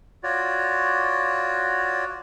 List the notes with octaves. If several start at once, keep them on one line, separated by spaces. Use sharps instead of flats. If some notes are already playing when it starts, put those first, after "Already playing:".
F4 F#4 C#5 D5